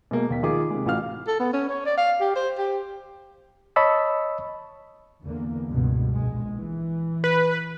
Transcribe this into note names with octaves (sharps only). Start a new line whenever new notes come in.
B2 G#3 A#3
D#2 B2 B6
D#3 F4 G#4 D6
C3 G#3
A1 E3 F#4 F5 F6
A4
B3
C#4
C#5
D5
F5
G4
C5
G4
C#5 D#5 A5 B5 C#6 E6
E2 D3 A#3
C#2 G2 B2
A#1 G#3
E3
B4